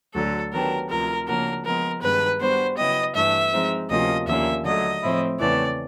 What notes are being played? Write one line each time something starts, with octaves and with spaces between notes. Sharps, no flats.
D2 D3 F#3 A4
D#3 F#3 B3 D4 G4 A#4
D2 C3 F3 A#4
C#3 F3 A#3 D4 F#4 A#4
F3 G#3 B3 A#4
G2 D#3 G#3 B3 D4 B4
G3 B3 D4 F#4 B4 C5
C#3 F#3 B3 E4 G4 D#5
G2 E3 A3 D4 E5
F3 G#3 C4 D#4
D2 C3 F3 A#3 C#4 D#5
D#2 D3 F3 A#3 C#4 E5
D3 F#3 A3 D#5
A2 F3 A3 C4 E4
E2 C#3 E3 A3 C4 D5